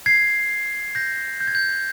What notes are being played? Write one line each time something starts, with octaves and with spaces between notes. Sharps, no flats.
G#6 C7
G6 A#6
G6
G#6
G6